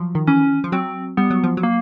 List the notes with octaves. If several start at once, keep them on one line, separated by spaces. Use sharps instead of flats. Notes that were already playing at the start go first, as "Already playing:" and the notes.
Already playing: F3 F#3
D#3
E3 C#4
F3
F#3 C4
G3 B3
F#3
F3
F#3
A#3